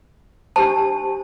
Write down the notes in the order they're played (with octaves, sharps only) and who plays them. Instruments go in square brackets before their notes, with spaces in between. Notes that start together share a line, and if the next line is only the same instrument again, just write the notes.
[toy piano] D4 G4 C5 A5